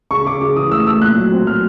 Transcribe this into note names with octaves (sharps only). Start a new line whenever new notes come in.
C#3 C#6
C#3 D6
C#3 D6
E3 D#6
A3 E6
A3 E6
A#2 F#6
F#3
C4
F#3 F6